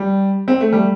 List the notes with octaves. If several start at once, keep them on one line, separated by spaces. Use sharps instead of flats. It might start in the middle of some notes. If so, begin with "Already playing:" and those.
Already playing: G3
C4
A3
G3